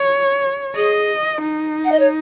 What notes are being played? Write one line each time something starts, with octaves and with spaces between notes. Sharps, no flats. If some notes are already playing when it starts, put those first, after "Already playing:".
Already playing: C#5
G#4 D#5
D#4
F#5
D#5
C#5